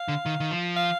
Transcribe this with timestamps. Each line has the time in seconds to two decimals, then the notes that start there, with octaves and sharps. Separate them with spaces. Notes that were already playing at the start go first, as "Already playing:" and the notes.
Already playing: F5
0.08 D3
0.26 D#3
0.40 D#3
0.51 F3
0.76 F5